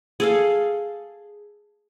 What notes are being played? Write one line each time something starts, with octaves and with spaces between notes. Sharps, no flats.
G#4 A4 F5